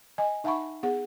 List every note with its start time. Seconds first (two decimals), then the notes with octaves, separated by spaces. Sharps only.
0.18 D#5 G#5
0.44 D#4 E5 F#5 A5 B5 C#6
0.83 B3 G#4 F#5